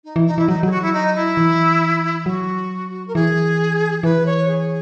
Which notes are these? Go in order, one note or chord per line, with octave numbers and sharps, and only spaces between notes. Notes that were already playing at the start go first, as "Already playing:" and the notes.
D#4
E3
D#4
E3 E4
F#3 D#4
F#3 G#4
F#4
E4
D#4
E4
E3
F#3 F#4
A#4
E3 G#4
E3 B4
C#5
G#4